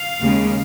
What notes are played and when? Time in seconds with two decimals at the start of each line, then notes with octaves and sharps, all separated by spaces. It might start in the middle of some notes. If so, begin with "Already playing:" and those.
Already playing: F5
0.20 D#2 C#3 G#3